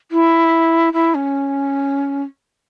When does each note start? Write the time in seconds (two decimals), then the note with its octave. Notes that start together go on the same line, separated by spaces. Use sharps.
0.11 E4
0.93 E4
1.14 C#4